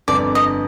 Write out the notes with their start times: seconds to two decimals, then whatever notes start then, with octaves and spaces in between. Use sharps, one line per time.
0.08 G1 F2 D3 D5
0.35 D#5